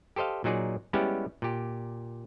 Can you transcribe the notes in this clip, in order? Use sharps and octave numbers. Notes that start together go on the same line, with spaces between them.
G4 A4 C5 D#5 F5
A#2 F#3 D#4 G#4 D5
G3 G#3 B3 C#4 E4 G4
A#2 G4